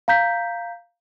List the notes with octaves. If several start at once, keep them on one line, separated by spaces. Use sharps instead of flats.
F5 A#5 G6 B6